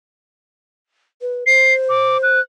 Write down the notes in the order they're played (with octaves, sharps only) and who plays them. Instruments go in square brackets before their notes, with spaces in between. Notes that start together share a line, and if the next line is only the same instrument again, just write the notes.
[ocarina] B4
[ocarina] C5 [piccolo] C7
[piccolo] D6
F#6